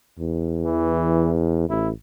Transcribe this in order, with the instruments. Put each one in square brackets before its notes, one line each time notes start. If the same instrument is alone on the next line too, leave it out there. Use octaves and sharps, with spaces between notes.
[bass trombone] E2
[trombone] E3
[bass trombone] A1 [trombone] E4